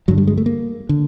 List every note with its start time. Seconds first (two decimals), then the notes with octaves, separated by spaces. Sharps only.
0.08 G2 D3 F#3
0.18 G3
0.27 G#3
0.37 A3
0.46 A#3
0.89 D3